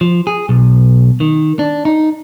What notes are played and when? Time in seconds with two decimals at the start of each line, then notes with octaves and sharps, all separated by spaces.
0.01 F3
0.27 G#4
0.49 B1
1.20 D#3
1.59 D4
1.85 D#4